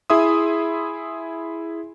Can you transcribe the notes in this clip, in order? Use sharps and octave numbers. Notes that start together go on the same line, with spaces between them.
E4 G#4 E5 C6 D#6